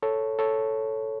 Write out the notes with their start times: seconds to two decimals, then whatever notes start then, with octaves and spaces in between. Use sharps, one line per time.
0.02 A4 C#5
0.39 A4 C#5